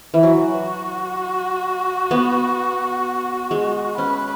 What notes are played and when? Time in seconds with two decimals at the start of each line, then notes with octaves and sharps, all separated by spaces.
0.14 E3
0.23 F#3 F#4
2.11 B3
3.51 G#3
3.97 C#4 B4